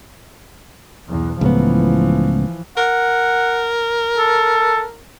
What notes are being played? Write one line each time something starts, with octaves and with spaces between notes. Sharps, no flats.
B1 E2
C#2 A2 E3 F3 B3
A#4 F#5
A4